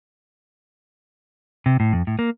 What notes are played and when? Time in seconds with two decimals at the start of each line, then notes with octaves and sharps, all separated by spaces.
1.66 C3
1.80 A2
1.93 F2
2.07 A2
2.19 A#3